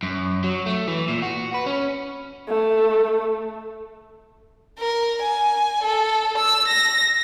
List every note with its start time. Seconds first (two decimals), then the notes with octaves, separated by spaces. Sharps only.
0.03 F#2
0.44 F#3
0.66 A3
0.88 E3
1.08 A#2
1.22 F#4
1.54 B4
1.66 C#4
2.48 A3
4.79 A#4
5.23 G#5
5.83 A4
6.38 E6
6.68 A#6